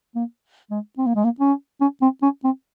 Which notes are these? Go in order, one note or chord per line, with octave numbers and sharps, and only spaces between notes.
A#3
G#3
C4
A#3
G#3
A#3
C#4
C#4
C4
C#4
C4